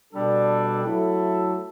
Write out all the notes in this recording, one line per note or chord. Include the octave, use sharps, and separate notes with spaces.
B2 G3 D4 A4
F#3 A3 E4 A4